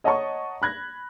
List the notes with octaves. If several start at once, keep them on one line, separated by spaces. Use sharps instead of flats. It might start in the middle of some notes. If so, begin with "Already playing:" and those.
C#5 D#5 F#5 A5 A#5 C#6
B5 F#6 G#6 A#6